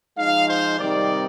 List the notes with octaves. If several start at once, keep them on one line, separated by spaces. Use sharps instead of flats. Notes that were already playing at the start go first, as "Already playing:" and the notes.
F3 G#3 D#4 F5
C5
C3 D#3 G3 C4 D#4 D5